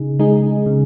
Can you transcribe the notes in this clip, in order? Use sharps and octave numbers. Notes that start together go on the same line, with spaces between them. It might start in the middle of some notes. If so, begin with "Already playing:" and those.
Already playing: C#3 D#4 G#4
G#3 D#4 G#4
C#3